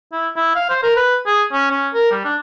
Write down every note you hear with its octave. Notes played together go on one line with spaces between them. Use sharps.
E4
E4
F5
C5
A#4
B4
G#4
C#4
C#4
A#4
G3
D4